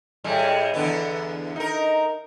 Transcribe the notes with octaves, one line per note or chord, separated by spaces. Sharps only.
A2 G3 G#3
E2 D3 B3
D#4 A#4